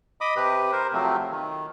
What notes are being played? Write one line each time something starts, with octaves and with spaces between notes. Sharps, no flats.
D#5 B5 D6 D#6
C3 G4 B4
A#4 C5
C3 F3 F#3 A3 C4
D#3